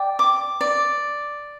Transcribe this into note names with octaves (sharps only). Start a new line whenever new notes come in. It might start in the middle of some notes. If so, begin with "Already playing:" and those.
Already playing: D5 G5
D6
D5